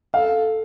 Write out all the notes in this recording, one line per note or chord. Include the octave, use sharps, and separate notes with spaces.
A4 F5